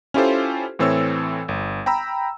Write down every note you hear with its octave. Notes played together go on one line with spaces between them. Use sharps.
C#4 E4 F4 G4 A4 C5
A2 E3 C4 A4 C#5 E6
G1
G5 A#5 B5 E6